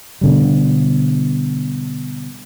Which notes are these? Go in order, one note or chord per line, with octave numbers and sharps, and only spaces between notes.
B2 D3 G3